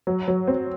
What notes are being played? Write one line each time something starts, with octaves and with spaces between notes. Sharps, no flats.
F#3
F#3
C4